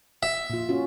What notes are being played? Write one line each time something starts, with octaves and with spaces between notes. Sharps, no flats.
E5
A#2 F4
C#4 F4 F#4